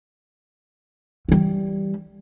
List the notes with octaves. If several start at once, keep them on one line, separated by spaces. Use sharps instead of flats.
E3 G3